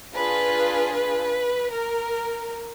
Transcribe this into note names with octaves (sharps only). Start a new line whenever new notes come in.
D4 F4 G#4 B4
B4
A#4